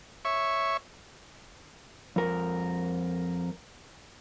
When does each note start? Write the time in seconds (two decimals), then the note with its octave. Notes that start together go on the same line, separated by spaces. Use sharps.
0.25 C#5 E5 C#6
2.16 F2 A#4